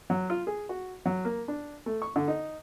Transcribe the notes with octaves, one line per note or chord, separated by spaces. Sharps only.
F#3
F4
G#4
F#4
F#3
A#3
D4
A3
C#6
D3
D#4